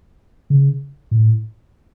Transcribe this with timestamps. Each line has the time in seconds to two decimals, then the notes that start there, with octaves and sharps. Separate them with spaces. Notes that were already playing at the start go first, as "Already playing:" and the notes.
0.50 C#3
1.11 A2